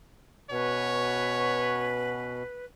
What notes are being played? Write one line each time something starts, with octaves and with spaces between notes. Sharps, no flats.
B2 C#4 F#4 B4 C#5